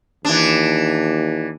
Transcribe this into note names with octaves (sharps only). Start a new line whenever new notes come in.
D#2 E3 D4